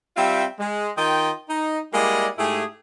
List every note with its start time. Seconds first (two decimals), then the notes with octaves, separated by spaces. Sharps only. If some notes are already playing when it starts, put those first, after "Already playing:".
0.17 G3 C4 F4 E5 G5
0.60 G#3
0.97 D#3 F4 D#5 G5
1.49 D#4
1.93 G3 G#3 A#3 E4 D5 D#5
2.38 G#2 A3 E4 G4 G#4